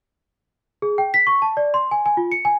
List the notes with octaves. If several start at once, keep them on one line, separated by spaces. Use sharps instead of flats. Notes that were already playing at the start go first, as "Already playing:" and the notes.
G#4
G5
B6
C#6
A5
D5
C6
G#5
G#5
F4
C#7
G#5